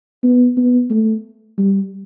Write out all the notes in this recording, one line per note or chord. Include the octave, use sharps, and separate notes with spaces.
B3
B3
A3
G3